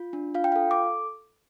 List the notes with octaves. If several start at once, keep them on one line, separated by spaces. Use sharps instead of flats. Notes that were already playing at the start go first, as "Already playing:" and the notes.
Already playing: F4
D4
F4 F5
G5
A4 F5
D6